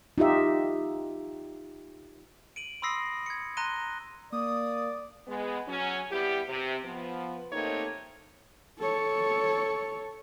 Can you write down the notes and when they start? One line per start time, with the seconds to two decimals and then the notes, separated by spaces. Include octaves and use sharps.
0.18 D#4 F4 G4 E5
2.56 D7 D#7 F#7
2.82 B5 C6 D#6 E6 A#6 C7
3.26 G#6 C#7
3.57 A#5 C6 F#6 A#6 D#7 G7
4.32 A#3 D5 D#6
5.28 G#3 B3
5.68 F#3 C#4
6.11 G3 B3 E4 G4
6.49 C3
6.85 F3 B3
7.52 D#2 A3 A#3 C4 D#4 C#5
8.79 A4 C#5